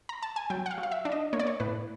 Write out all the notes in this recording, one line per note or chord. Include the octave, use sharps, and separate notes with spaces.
A#5
A5
G#5
F#3 G5
F#5
F5
F#3
F5
E5
D4
D#5
A#3 C#5
D5
C#5
A2 B4